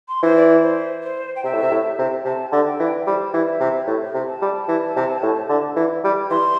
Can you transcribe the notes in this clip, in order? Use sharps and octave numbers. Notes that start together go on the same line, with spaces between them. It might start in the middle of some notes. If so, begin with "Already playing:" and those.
C6
E3 C5
D5
C5
C5
G5
C3 E5
A2
C3
A2
C3
C3 A5
D3
G5
E3
G3 C5
E3
E5
C3
A2
C3
A5
G3
E3
C3
A2
D3
E3
G3
E3 C6